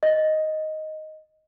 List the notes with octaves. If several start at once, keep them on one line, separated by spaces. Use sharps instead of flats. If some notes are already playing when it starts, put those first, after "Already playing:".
D#5